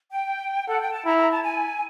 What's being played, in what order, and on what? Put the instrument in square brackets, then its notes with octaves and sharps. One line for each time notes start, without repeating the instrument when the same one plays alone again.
[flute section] G5
[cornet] A4 [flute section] F#5
[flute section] G5
A5
[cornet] E4 [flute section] A#5
[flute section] A#5
A5
G#5